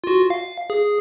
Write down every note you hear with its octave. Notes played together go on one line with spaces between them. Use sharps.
F4 F#4
F5
G#4